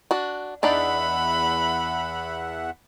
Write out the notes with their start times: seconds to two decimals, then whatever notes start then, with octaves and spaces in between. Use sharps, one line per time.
0.11 D4 F#4
0.63 E2 D4 D#4 D5 E5 F#5 B5